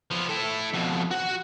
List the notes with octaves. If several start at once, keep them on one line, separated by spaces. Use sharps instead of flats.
F3 B3
E4 A4
F2 B2
F#4 F#5